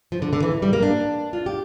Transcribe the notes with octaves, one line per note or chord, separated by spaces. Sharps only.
F3
D3
D3
E3
G3
A#3
D4
F4
G4